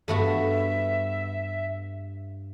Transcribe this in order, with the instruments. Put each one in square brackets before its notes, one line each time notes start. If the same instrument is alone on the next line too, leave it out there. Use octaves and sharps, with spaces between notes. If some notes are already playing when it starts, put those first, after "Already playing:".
[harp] G2 [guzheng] A3 B3 F#4 [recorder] E5